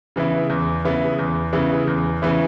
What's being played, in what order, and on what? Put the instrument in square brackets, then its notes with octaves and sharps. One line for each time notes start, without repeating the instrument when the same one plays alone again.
[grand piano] C#3 E3 B3 E4
E2
C#3 E3 B3 E4
E2
C#3 E3 B3 E4
E2
C#3 E3 B3 E4